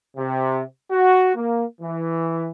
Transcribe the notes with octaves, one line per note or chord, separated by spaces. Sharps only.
C3
F#4
A#3
E3